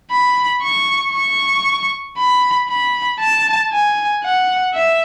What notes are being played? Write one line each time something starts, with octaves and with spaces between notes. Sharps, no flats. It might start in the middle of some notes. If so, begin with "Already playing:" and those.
B5
C#6
C#6
B5
B5
A5
G#5
F#5
E5